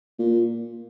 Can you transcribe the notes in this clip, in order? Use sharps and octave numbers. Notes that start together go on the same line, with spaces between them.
A#2